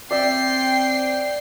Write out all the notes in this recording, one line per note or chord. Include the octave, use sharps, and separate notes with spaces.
C4 D5 E5 G5 C7